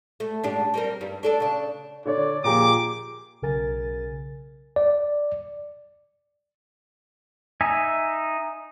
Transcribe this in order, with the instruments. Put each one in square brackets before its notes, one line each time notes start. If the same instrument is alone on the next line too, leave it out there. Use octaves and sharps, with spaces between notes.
[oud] A3
G#2 D4 G4
G3 C4 A#4
G2 G3
D4 A4 D5
C#3 D4
[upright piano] D3 C#5 [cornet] D5
[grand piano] A#2 F3 [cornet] G4 [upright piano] G#4 A#5 [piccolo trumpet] D6
[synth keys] B1 C#3 A#4 G#5 A6
[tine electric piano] D5
[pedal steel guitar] D#4 E5 G#5